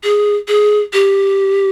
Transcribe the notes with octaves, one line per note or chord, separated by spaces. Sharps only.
G#4
G#4
G4